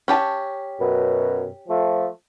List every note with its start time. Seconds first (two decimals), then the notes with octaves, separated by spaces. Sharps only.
0.08 C#4 G4 A5
0.79 F#2 B2
1.68 F3 A3